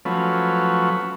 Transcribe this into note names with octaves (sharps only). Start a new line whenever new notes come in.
F3 F#3 A3 C#4 B4